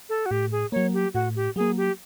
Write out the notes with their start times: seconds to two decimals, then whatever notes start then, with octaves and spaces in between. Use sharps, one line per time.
0.09 A4
0.26 F#4
0.31 A2 G4
0.52 G#4
0.72 F#3 A#3 C#5
0.93 G4
1.14 A2 F#4
1.36 G4
1.56 F#3 A#3 G#4
1.77 G4